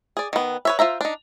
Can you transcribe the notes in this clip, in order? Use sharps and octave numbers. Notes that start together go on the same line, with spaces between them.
G#4 D5
D#3 B3
B4 C#5 E5
F4 C5 E5 A#5
D4 D#4